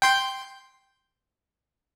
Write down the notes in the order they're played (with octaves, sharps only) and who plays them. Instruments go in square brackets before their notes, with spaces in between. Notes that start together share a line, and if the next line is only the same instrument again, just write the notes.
[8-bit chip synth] G5 C6 G6